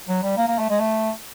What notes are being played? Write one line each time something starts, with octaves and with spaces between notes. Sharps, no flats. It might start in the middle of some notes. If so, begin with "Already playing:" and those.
F#3
G3
A#3
A#3
A3
G#3
A3